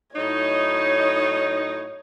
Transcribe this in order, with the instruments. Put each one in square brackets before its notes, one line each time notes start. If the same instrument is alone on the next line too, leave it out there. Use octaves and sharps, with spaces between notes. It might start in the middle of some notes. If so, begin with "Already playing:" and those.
[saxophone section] A2 F#3 D#4 [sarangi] C#5